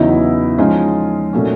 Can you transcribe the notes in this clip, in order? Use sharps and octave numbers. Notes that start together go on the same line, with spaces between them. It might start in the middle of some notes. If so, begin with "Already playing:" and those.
Already playing: E2 C#3 F#3 B3 D#4 E4
F3 G#3 C#4 D#4 F4 G#4
A#2 F#3 A3 C#4